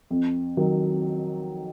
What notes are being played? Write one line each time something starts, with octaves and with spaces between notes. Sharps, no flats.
F2
D#3 F#3